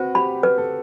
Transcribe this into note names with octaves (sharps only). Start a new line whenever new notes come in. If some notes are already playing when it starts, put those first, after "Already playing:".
Already playing: C4 F#4 B4 C5
G4 B5
B4
A4